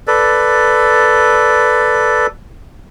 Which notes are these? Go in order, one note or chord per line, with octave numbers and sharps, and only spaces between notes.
A4 B4 D5